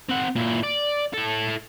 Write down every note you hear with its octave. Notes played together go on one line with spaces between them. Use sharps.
C4 F#5
A#2 E4
D5
E4 A4